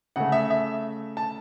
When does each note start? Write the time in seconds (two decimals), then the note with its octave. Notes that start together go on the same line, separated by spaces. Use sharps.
0.16 C#3 A3 F#5
0.32 E5
0.50 E5
1.17 A5